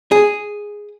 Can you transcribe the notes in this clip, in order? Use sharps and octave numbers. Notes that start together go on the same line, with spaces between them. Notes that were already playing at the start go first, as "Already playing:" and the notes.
G#4